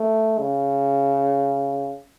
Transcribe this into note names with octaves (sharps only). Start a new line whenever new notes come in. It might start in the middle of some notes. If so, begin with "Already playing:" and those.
Already playing: A3
C#3